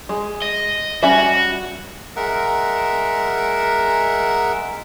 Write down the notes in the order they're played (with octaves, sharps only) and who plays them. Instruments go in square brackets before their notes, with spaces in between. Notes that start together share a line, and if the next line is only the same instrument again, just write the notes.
[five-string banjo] G#3
[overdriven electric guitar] D#5
[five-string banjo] G3 C#4 E5 [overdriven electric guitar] F#4
[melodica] G#3 A#4 E5 F#5